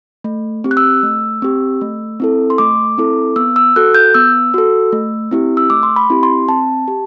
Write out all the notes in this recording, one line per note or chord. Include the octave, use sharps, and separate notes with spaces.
A3
C4 G4
F#6
E6
A3
C4 G4
A3
C4 E4 A4
C6
A3 D6
C4 E4 A4
B3 E6
E6
F#4 A4 F#6
G6
B3 E6
F#4 A4
A3
C4 E4 G4
E6
A3 D6
C6
B5
C4 E4 G4
C6
C4 A5
G4